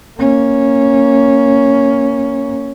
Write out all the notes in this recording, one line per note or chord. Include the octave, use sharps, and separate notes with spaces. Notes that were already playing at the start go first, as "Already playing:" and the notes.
A#3 C#4